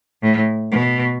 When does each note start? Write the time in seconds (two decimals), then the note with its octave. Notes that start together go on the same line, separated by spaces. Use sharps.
0.22 A2
0.72 B2